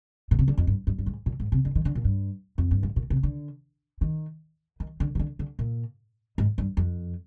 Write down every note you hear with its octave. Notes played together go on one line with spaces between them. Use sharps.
A#2
C3
D3
F2
G2
G2
G2
G#2
A#2
G#2
C3
D3
D#3
D3
A#2
G2
F2
G2
G#2
A#2
C3
D3
D#3
D#3
D3
D#3
D3
D3
A#2
G#2
G2
F2